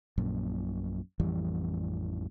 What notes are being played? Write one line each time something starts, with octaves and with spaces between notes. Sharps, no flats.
A#1 F#2 A#2
A1 F2 E3 G3